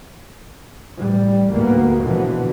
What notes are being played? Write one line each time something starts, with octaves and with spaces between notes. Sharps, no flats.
A1 G3
D2 G#2 A#3 B3
B2 D3 E3 F3 B3